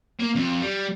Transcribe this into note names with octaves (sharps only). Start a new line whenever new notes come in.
A#3
F2
G3